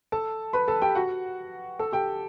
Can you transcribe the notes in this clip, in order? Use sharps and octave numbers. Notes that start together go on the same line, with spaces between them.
A4 A5
B4 B5
A4 A5
G4 G5
F#4 F#5
A4 A5
G4 G5